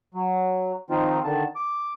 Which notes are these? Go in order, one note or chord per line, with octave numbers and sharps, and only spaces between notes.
F#3
D#3 F3 C4 D#4 F4
D3 D#3 A5
D6